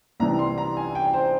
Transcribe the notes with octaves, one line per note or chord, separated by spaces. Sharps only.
C2 C3 E3 G3 A#5
C6
A#5
G#5
G5
C5